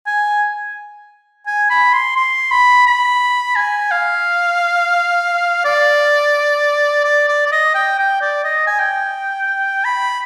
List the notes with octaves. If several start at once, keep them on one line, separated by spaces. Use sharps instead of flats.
G#5
G#5
B5
C6
C6
B5
B5
G#5
F5
D5
D5
D5
D5
D#5
G5
G5
D5
D#5
G#5
G5
B5